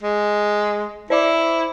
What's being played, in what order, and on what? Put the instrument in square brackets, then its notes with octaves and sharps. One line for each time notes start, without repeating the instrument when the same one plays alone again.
[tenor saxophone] G#3
[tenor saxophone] E4 [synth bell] C5 D5 D6